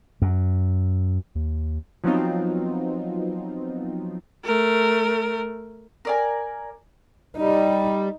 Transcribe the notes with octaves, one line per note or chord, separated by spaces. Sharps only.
F#2
D#2
F3 F#3 B3 C4 D#4 F4
A3 A#4
A#4 D5 G#5
G3 D#4